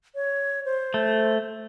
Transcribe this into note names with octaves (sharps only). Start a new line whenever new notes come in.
C#5
C5
A3